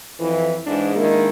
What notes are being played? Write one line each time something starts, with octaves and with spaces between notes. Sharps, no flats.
F2 E3
G#2 E3 D4 G#4
D#3 G#3 A#3 D4 E4